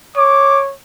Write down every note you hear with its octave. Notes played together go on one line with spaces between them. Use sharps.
C#5 D6